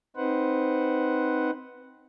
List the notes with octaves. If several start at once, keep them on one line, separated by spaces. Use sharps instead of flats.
C4 D#4 B4 C5 F#5